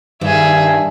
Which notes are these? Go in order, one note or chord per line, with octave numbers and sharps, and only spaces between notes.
G2 D#3 G#4 E5